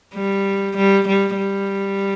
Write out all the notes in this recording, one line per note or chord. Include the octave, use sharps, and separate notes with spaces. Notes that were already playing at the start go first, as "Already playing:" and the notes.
G3
G3
G3
G3